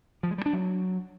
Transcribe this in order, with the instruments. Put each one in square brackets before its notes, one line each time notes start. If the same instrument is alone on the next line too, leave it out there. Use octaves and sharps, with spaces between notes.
[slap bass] F3
G#3
G3
D4
F#3